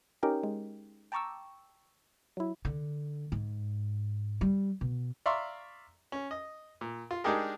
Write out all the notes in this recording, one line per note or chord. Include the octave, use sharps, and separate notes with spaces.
C#4 D#4 G4 A#4 G5
G#3
G5 A5 A#5 C#6 D6 E6
F#3 E4
D3
G#2
G3
B2
D5 E5 F5 A#5 C6 C#6
C#4
D#5
A#2
F4
G#3 D4 D#4 G4 G#4 A#4